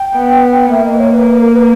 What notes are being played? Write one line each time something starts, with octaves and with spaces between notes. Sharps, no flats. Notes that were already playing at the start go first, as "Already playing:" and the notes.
Already playing: G5
B3
A#3 E5
D#5
B4
C#5
B4
B4
A#4
B4